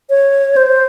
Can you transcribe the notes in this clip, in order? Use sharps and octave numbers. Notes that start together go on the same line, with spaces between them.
C#5
C5